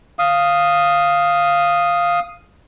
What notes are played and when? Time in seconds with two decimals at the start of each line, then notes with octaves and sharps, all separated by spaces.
0.19 F5 D#6